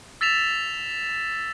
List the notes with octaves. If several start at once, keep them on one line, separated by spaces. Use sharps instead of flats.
E6 A6 B6 E7 F7